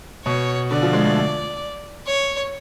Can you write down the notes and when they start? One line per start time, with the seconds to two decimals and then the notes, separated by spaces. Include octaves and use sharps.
0.25 B2 C#5
0.71 D3 D5
0.82 F3
0.93 G#3
1.05 A3
2.06 C#5